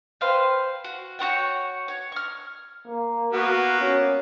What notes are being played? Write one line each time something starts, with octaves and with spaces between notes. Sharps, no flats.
B4 C5 F5 G5
F#4
F#4 C#5 F#5 G5
C#5
C#6 F6
A#3
A#3 B3 F#4
C#4